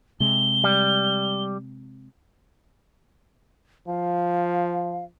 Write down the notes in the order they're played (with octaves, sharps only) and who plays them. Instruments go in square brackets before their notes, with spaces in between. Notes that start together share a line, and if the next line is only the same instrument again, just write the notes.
[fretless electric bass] C3 G#3 [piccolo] G7
[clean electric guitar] G3
[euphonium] F3 [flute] F5